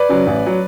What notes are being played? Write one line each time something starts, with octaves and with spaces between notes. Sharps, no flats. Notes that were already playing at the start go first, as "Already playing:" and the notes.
Already playing: B4 D5
C#3 F#3
A1
F#3